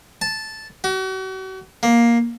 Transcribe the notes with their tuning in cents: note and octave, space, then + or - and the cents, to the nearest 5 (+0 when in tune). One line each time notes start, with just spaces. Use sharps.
A5 -5
F#4 +40
A#3 +10